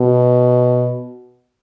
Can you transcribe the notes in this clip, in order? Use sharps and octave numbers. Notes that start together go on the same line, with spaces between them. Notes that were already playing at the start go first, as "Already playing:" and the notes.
Already playing: B2